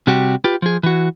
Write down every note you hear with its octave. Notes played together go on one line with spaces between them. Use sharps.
C3 G3 F#4 G4
F4 G4 B4
F3 G#4
E3 F#4